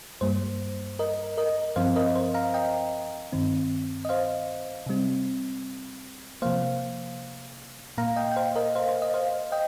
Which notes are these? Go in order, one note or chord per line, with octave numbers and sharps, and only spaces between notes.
G2 G3 A#3 C5
A#4 D#5
A#4 D#5
G2 F3 C4 C5 F5
A#4 D#5
C5
F5 A#5
D#5 G5
G2 D#3 C4
D#5
C5 F5
C3 G3 C4
C3 F3 A#3 C5 F5
A#2 A#3 F5 A#5
D#5 G5
G5
C5 F5
A#4 D#5
C5 F5
C5
D#5
C5 F5
D#5 G5